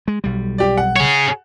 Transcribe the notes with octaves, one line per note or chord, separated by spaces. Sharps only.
G#3
B1 G3
G4 D5
F#5
G#4 C#5